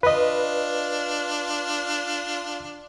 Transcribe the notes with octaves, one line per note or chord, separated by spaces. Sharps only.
D4 F4 B4 D#5